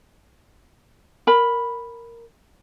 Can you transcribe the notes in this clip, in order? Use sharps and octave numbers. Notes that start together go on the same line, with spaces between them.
A#4 B5